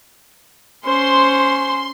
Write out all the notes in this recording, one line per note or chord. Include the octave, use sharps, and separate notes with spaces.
C#4 C5 C6